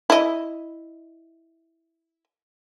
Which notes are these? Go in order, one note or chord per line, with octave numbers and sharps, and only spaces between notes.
E4 D#5